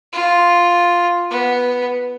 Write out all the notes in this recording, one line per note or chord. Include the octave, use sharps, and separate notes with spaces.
F4
B3